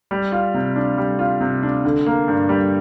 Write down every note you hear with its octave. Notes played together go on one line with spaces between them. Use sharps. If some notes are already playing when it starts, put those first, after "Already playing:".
G3
F4
C3
D4
G3
F4
C3
D4
D3
A#3
G2
G3